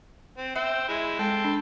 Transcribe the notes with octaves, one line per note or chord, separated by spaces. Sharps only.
C4
C5 E5 G5 E6
G#3 E4
G#3 A4 G5 C6
D4